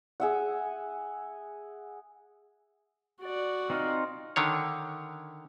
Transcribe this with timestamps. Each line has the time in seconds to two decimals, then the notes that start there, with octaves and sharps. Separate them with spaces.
0.20 G#4 E5 F#5
3.22 F#4 D5
3.70 C4 D#4 F4
4.36 D3 D#3 C#5